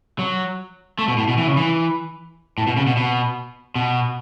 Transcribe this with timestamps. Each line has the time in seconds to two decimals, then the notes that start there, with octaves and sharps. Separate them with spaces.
0.19 F#3
0.99 A3
1.08 B2
1.18 A2
1.28 B2
1.38 E3
1.48 C#3
1.57 E3
2.58 A2
2.67 B2
2.77 C#3
2.87 B2
2.97 B2
3.75 B2